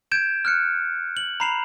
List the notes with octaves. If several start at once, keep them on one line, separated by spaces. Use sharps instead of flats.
G6 G#6 D7 E7
F6 F#6 C#7
F#7
A#5 B5 C7 E7 F7